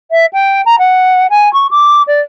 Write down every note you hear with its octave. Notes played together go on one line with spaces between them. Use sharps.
E5
G5
A#5
F#5
G#5
C#6
D6
D5